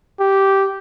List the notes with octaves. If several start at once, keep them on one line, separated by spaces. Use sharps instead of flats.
G4